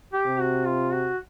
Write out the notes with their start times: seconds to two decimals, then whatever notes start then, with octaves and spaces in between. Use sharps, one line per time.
0.13 G4
0.27 C3
0.40 F#4
0.67 F4
0.93 F#4